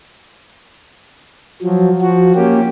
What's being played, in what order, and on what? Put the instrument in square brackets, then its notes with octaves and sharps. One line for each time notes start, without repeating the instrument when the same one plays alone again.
[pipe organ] F3 F#3
F3 F#4
A#3 C#4 G4